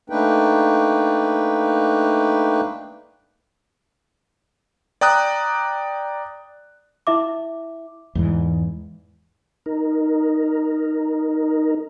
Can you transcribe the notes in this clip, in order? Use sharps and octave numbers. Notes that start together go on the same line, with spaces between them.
A3 A#3 D4 D#4 B4 G5
D5 G5 A#5 D#6 F#6
E4 E5 D6
E2 G#2 E3
D#4 A#4